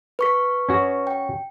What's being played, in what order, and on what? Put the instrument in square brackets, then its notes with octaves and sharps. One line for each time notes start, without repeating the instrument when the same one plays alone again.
[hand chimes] B4 C#6 B6
[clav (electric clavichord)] C#4 F#4
[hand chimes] G5